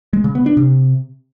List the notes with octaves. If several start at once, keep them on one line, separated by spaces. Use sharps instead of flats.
G#3
C#3
B3
D4
C3